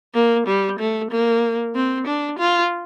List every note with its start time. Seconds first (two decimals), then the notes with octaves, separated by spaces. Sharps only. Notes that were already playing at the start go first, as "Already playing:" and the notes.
0.14 A#3
0.47 G3
0.79 A3
1.11 A#3
1.75 C4
2.07 D4
2.39 F4